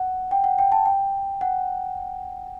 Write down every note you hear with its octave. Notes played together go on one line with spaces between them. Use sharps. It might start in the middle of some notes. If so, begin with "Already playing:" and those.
Already playing: F#5
G5
F#5
G5
A5
G5
F#5